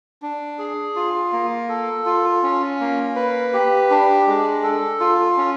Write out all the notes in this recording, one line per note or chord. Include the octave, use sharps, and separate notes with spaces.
D4
G#4
F4
A#3
A4
F4
C#4
A#3
B4
G4
D4
G#3
A4
F4
C#4